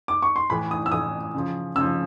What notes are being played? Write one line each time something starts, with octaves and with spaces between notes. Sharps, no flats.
D6
C#6
C6
A2 E3 B5
D#6
E6
A2 E3 D#6
C#3 F3
C#3 E6
F3